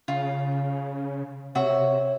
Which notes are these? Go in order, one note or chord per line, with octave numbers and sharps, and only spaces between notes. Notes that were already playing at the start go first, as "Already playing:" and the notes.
C#3 F4
C3 F#4 C#5 E5